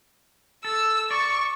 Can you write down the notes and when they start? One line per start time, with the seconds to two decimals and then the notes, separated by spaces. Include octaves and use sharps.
0.65 A4 E6
1.11 D5 C#6